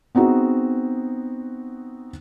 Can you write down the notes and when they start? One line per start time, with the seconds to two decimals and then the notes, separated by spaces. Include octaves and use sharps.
0.15 B3 C4 D#4 F#4 G#4